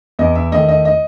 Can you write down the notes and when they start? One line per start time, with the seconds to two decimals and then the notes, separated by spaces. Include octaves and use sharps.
0.19 E2 D#5
0.35 E5
0.52 D#3 A3 D#5
0.69 D#5
0.85 D#5